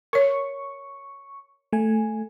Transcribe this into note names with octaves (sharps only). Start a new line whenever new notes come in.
A#4 C#5 C#6
A3 G#5